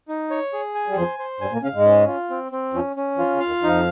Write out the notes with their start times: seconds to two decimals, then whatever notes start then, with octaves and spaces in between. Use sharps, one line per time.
0.08 D#4
0.31 C#5
0.53 G#4
0.75 G#5
0.88 G3
0.96 F2 F3 C5
1.19 C5
1.40 G2 G3 G#5
1.52 A#2 A#3
1.63 C#3 C#4 F5
1.74 G#2 G#3
1.85 C#4
2.08 F4
2.30 C4
2.52 C4
2.73 F2 F3 C#4
2.96 C#4
3.17 F2 F3 F4
3.33 C#3
3.40 F5
3.47 D#2 D#3
3.62 F2 F3 D#4